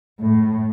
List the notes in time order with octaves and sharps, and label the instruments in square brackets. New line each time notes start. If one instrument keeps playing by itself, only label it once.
[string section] A2